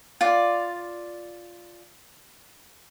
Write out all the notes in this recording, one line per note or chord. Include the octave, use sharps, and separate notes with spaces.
F4 D5